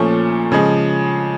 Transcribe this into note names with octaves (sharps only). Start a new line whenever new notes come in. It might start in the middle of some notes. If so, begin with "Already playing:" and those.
Already playing: A#2 F3 A3 C#4
C#3 F3 G#3